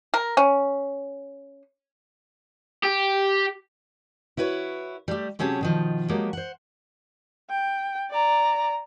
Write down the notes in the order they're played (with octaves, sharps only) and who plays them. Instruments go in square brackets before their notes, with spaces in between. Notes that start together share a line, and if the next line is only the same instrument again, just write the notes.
[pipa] A#4
C#4
[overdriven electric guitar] G4
[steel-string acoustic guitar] E4 F#4 B4 C#5
G3 A3 G4
C3 F#3 C#4 G4 G#4 A5
B2 D#3 F3
F3 F#3 G#3 A#3 G4
C5 F#5
[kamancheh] G5
D5 A#5